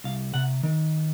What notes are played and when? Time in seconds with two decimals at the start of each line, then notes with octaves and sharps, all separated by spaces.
0.04 C2 F5
0.34 C3 F#5
0.63 D#3